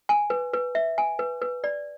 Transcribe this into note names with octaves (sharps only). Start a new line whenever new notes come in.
G#5
B4
B4
E5
G#5
B4
B4
D5